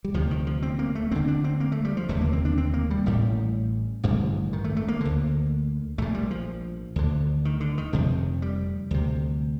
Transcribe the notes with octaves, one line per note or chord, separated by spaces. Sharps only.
G3
D2 C3 F3
D#3
F3
C4
A#3
A3
D2 D3 C4
D4
C4
A#3
A3
G3
F3
F1 D#2 D3 A3
A#3
C4
D4
C4
A#3
G3
A1 A2 G3
A1 G2 D3
D#3
A3
A3
A#3
D2 D3
A#1 A#2 A3
G3
F3
D2 D3
D#3
D3
D#3
F1 F2 C3 F3
G3
D2 C3